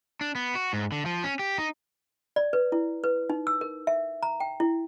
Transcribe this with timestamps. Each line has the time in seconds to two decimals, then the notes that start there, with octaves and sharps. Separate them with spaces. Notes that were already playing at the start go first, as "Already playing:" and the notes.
0.21 D4
0.35 B3
0.55 F#4
0.73 G#2
0.92 D3
1.06 F3
1.24 C#4
1.39 G4
1.58 D#4
2.36 D5
2.53 B4
2.72 E4
3.04 B4
3.30 D#4
3.47 E6
3.61 A#4
3.87 E5
4.23 A#5
4.40 G5
4.60 E4